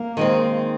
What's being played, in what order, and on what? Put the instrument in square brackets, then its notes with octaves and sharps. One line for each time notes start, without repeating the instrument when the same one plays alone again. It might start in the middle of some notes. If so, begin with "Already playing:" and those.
Already playing: [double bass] A#3
[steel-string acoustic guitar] D#3 G#3 C4